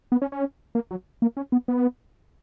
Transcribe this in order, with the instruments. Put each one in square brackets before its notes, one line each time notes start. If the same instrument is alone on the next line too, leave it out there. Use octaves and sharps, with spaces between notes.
[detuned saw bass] B3
C#4
C#4
A#3
F#3
A#3
C#4
B3
B3